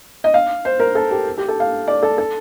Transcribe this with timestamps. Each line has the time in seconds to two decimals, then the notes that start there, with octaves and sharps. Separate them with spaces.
0.24 D#5
0.34 F5
0.65 C5
0.80 A#4
0.95 A4
1.11 G4
1.38 G4
1.48 A4
1.60 F5
1.88 D5
2.03 A4
2.18 A4